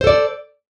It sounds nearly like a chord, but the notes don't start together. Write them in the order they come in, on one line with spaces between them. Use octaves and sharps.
C5 A4 D5